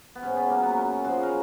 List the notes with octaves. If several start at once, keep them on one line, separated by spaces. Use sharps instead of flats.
B3
G#2 C#4
B3
F#3 A#3
B3
F#2 C#4
C#3 F3 G#3 F#4
A#4